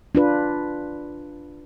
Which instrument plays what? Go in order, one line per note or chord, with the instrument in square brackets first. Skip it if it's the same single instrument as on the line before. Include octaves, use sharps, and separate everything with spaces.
[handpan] D4 F4 B4